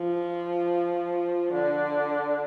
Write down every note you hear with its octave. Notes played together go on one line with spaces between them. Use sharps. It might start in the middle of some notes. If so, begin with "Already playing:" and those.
Already playing: F3
D3